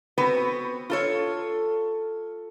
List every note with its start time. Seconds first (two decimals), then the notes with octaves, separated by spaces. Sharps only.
0.18 B3 C4 F#4 B4
0.90 F4 A4 C#5